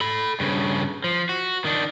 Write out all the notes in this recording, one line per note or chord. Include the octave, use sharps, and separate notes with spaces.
A4 B5
G2 C#3
F3
F#4
D#3 D4